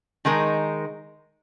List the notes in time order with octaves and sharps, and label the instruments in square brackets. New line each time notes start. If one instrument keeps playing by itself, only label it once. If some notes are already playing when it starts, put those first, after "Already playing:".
[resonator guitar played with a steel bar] D#3 G#3 D#4 A#4